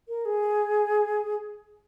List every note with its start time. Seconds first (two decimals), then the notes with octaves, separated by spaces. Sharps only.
0.09 A#4
0.25 G#4